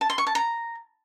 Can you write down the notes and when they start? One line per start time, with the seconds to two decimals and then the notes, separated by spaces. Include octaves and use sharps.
0.01 A5
0.10 C6
0.18 C#6
0.27 A5
0.35 A#5